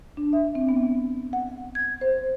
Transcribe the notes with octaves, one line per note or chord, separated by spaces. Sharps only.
D4
E5
C4
B3
F#5
G#6
C5